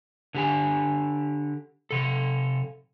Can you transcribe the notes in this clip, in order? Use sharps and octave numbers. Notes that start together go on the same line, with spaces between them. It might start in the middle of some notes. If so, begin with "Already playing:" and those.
D3 G4 G#5
C3 A4